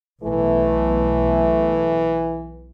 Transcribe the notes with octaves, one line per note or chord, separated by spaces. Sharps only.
B1 E3 A3